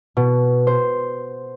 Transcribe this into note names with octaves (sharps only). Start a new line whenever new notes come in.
B2
C5